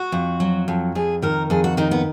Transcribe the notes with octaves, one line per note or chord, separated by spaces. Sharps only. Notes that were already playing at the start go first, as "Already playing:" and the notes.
Already playing: F#4
F2
F#3
F2
F2 G#4
D#3 A#4
F2 G#4
F#4
D#3 D#4
B3